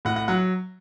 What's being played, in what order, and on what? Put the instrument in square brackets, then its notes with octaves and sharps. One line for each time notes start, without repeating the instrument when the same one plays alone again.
[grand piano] A2 F#5
F#5
F#3 F#5